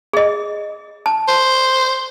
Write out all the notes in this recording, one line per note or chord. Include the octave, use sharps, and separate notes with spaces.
G#4 D#5
A5
C5